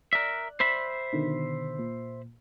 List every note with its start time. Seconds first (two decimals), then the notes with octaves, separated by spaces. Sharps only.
0.13 A#4 D5 E5 F#6
0.60 C5 E5 B5
1.13 B2 D3 D#3
1.79 A#2